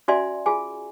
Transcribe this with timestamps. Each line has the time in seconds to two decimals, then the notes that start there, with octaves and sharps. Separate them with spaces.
0.08 C#4 F#4 D5 E5 G#5 C6
0.46 F4 G#4 G#5